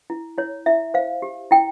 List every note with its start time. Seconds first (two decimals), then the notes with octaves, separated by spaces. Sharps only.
0.10 E4
0.38 E4 C#5
0.66 E4 E5
0.94 C5 F5
1.22 G4
1.51 E4 G5